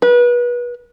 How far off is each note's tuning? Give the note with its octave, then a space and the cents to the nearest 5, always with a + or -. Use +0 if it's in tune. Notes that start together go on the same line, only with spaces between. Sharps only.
B4 -30